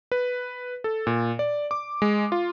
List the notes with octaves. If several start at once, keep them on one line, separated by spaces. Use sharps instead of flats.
B4
A4
A#2
D5
D6
G#3
F4